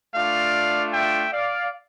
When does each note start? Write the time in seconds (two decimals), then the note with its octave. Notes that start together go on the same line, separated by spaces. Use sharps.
0.14 A3 D4 F4 D5 F5
0.93 E5 G5
1.32 D5 F5